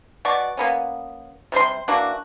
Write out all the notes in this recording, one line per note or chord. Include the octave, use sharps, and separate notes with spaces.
B2 F#4 D5 C#6
A#3 B3 C#4
C3 G3 C5 C6
E3 A#3 D4 F#4